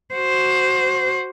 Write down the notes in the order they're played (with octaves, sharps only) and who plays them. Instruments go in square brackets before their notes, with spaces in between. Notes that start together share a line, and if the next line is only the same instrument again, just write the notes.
[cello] F#4 C5